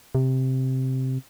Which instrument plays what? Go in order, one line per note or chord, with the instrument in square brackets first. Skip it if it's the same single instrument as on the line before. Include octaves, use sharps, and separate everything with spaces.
[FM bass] C3